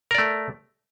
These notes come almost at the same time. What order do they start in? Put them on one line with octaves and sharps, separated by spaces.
A#4 D5 A3